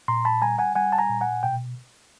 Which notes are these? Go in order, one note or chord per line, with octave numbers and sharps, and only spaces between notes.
A#2 A#5 C6
A5 B5
G3 G#5 A#5
F#5 G#5
G3 F#5 G#5
A5
G#5 A#5
A#2
F#5 G#5
B2 G5